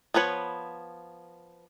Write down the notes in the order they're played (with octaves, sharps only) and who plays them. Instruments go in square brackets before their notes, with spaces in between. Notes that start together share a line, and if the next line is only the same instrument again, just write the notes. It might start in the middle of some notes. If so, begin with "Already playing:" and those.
[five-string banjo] F3 B3 B4 C#5